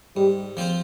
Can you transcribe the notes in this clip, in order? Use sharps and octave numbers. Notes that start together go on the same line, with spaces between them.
G#2 G3 G4
F3 C4 F4 C5